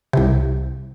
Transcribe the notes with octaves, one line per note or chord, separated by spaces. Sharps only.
C2 C3